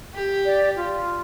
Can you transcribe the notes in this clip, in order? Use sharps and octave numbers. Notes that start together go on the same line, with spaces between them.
G4
D5
F4